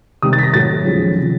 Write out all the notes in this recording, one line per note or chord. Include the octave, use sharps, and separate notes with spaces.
C3 D#3 G3 D#6
A6
B6
A#6
A2 F#3 A3 C4 A6
D#2 C#3 F3 G#3 C#4
C3 F3